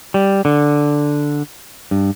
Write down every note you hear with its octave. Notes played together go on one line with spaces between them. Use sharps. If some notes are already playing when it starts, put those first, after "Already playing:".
G3
D3
G2